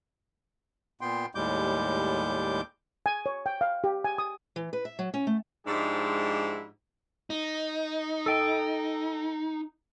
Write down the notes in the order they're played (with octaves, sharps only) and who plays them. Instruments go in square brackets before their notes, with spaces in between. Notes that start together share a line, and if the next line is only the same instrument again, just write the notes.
[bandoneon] A#2 B3 G5 C6
D#2 A2 G3 G#3 D6 G6
[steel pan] G#5
C#5
G5
F5
G4
G#5
D#6
[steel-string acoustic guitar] E3
B4
E5
F#3
C#4
A3
[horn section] G#2 F3 G#3 D4 E4 G4
[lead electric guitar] D#4
[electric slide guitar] A4 G5